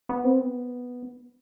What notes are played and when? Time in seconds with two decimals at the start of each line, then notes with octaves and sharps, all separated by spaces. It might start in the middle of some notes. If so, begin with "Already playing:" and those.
0.09 B3
0.24 C4
0.40 B3